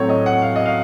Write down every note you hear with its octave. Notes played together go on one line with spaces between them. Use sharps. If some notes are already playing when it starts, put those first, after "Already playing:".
Already playing: A2 F#3 A3 C4 C#5
D#5
F#5
F5
D#5
F5